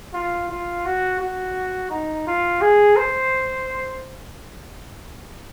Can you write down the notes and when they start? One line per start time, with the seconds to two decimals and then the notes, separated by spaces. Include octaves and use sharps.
0.14 F4
0.49 F4
0.85 F#4
1.20 F#4
1.90 D#4
2.27 F4
2.61 G#4
2.97 C5